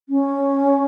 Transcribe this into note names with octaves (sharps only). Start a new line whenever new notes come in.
C#4